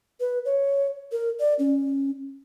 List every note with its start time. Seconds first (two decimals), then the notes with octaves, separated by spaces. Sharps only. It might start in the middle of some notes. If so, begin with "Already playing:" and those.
0.20 B4
0.45 C#5
1.12 A#4
1.40 D5
1.59 C#4